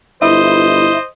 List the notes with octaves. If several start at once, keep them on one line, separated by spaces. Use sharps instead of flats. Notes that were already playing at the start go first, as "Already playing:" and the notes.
G1 E4 C5 D#5